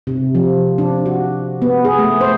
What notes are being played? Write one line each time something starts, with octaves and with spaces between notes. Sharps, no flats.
C3
F3
D4
F#4
B3
G#4
A3
C5